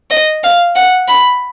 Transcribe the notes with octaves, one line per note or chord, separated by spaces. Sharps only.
D#5
F5
F#5
B5